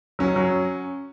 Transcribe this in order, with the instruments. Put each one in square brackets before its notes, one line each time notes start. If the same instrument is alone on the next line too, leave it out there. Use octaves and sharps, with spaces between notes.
[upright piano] F#3 [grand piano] C#4
[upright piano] F#3